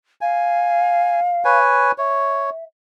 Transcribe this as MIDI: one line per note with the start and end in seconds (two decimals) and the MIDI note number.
0.21 1.58 77
0.21 1.20 80
1.45 1.92 71
1.45 1.92 73
1.45 1.92 80
1.98 2.50 73
1.98 2.64 76